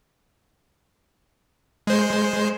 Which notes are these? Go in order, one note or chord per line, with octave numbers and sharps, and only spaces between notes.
G#3 C5